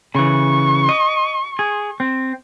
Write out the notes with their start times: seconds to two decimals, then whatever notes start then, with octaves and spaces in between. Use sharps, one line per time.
0.15 C#3 E3 C#6
0.89 D#5
1.59 G#4
2.00 C4